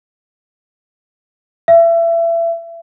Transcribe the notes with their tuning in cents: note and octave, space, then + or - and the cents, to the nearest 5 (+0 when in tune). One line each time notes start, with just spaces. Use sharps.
E5 +30